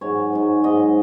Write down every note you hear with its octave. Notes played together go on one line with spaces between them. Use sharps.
G#2 F#3 C#5
G#2 F#3
G#2 F#3 D#5